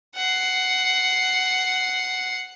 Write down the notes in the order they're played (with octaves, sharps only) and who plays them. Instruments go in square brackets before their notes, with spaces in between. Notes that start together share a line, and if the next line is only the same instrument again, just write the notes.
[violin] F#5 C7